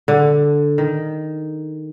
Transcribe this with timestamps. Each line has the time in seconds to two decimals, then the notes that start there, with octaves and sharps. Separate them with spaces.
0.08 D3
0.78 D#3